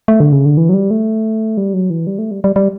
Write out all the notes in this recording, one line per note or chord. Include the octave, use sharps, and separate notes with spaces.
A3
D3
C#3
D3
E3
F#3
G3
A3
G3
F#3
E3
G3
A3
G3
G3
G3